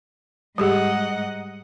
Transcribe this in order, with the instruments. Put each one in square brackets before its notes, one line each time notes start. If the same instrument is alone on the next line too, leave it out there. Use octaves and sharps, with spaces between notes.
[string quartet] G#2 D#5 F#5 [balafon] G3 G4 G#4